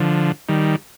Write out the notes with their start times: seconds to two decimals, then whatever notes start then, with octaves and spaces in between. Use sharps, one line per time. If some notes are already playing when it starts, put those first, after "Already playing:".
Already playing: D3 F3
0.49 D#3 G3